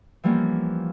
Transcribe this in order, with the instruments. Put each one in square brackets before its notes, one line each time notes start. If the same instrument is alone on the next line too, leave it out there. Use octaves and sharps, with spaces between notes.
[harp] E3 F3 G3 A#3 B3 C#4